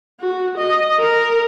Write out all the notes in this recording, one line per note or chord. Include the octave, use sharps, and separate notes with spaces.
F#4
D#5
A#4